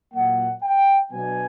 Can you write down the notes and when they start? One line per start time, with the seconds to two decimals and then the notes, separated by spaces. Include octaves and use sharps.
0.13 A#2 F#3 A#3 F#5
0.62 G5
1.11 B2 F#3 B3 D4 G#5